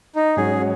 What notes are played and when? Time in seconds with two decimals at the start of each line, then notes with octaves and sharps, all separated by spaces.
0.16 D#4
0.36 G#2 F#3 C#4 G#4